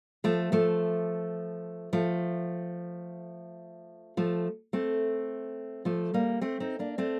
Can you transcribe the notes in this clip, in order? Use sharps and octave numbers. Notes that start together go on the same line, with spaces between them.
F3 A3
F3 A3
F3 A3
F3 A3
A3 C4
F3 A3
G3 A#3
A3 C4
C4 D#4
A#3 D4
A3 C4